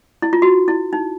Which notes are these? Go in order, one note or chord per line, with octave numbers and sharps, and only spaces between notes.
E4
F4
F#4
E4
D#4